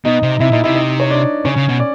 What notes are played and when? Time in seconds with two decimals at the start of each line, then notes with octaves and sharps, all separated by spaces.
0.05 B2 D#4 D#5
0.23 C3
0.40 C3 E4 E5
0.52 A#2 D#4 D#5
0.64 C3 E4 E5
0.75 D#4 D#5
1.00 C#5
1.10 D4 D5
1.45 C#3 C#4 C#5
1.57 C#3
1.69 B2
1.80 D5